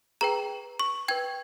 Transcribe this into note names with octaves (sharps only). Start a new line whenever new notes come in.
G#4 B4 G5 A#5
C#6
B4 G5 G#6